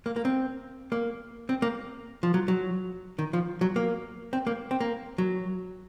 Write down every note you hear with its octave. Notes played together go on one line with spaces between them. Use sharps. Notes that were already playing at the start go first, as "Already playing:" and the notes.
A#3
A#3
C4
A#3
C4
A#3
F3
F#3
F#3
D#3
F3
F#3
A#3
C4
A#3
C4
A#3
F#3